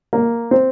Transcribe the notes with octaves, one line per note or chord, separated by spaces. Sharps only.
A#3
C4